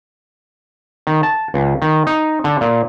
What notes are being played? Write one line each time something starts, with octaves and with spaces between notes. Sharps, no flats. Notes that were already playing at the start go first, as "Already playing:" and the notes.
D#3
A5
C#2
D#3
D#4
D3
A#2